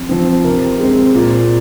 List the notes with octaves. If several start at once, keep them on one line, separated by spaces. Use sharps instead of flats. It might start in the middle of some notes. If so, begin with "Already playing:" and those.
Already playing: F2
F3 C4
C3 A#4
G#3 C4
A#2